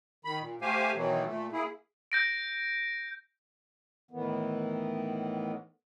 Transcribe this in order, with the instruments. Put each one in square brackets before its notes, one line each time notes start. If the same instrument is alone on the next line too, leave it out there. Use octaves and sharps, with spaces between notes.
[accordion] D#3 B5
A#2
A3 G4 C5 F5 G#5
B2 D#3 E3 F#3
A#2 A3
A#3 E4 G#4
[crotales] G6 A#6 D7
[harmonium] A2 D#3 E3 B3